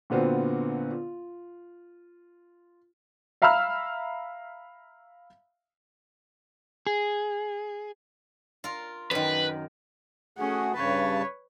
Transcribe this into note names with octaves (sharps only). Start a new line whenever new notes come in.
A#2 D3 B3 C4 F4 F#4
F4
E5 F5 A#5 B5 E6 F6
G#4
F4 A#4
F#2 D#3 B4
A3 C#4 F#4 G#4 F#5
G2 C#3 B4 C#5 A5